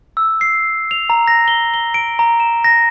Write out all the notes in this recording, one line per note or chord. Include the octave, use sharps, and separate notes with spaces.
E6
C7
F7
A#5
A#6
G7
G7
D7
A#5
E7
A#6